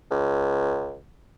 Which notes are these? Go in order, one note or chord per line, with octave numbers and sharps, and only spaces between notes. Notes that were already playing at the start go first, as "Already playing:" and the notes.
C#2